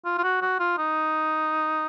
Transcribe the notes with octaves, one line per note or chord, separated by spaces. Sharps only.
F4
F4
F#4
F#4
F4
D#4